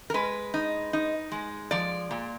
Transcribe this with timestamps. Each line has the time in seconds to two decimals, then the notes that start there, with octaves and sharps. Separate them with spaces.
0.10 A#4
0.14 G#3 B4
0.54 D#4
0.93 D#4
1.32 G#3
1.71 F3 D5
2.11 A#2